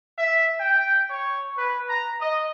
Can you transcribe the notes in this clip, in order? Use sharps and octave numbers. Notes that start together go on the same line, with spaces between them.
E5
G5
C#5
B4
A#5
D#5